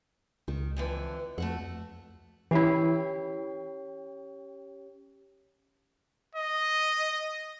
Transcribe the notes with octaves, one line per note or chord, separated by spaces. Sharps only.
C#2 D#3
F2 D3 E3
F2 A3 F#4 F#5
E3 C#4 E4 G4 C#5
D#5